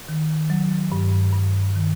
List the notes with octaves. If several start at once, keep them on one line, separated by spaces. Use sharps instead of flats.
D#3
F#3
G2
G2
D#3